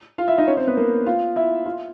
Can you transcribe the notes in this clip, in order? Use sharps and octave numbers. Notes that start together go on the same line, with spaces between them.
F4 F5
E4 E5
D#4 D#5
C#4 C#5
C4 C5
B3 B4
A#3 A#4
F4 F5
E4 E5
F4 F5